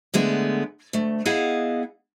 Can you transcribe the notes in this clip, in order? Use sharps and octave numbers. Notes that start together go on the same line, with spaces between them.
D3 G#3 A3 B3
D2 A3
B3 E4 G#4 D#5 F5 F#5